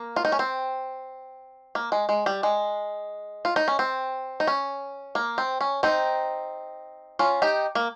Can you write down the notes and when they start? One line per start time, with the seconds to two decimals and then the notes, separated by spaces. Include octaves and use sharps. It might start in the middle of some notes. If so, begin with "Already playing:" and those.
Already playing: A#3
0.16 F4
0.25 D#4
0.32 C#4
0.39 C4
1.75 A#3
1.92 G#3
2.09 G#3
2.26 G3
2.43 G#3
3.45 F4
3.56 D#4
3.68 C#4
3.79 C4
4.40 D#4
4.47 C#4
5.15 A#3
5.38 C4
5.61 C#4
5.83 C4 D#4
7.19 C#4 F4
7.42 D#4 G4
7.75 A#3